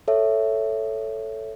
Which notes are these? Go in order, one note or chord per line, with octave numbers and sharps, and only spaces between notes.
A4 C#5 E5